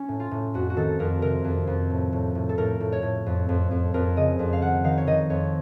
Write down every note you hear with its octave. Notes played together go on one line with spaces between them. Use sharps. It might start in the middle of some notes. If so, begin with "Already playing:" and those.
Already playing: C#4
A2
F4
A2
F2 F#4
F#4
D#3 A4
F2 A#4
C3 A#4
F2
F2
A2
A2
A2
A4
A2 A#4
A2
C#5
A2
F2
F2
F2
F2 A#4
C#3 D#5
F2
F5
D#3 F#5
D#3 F5
C#5
D#3 D#5
F2 C#5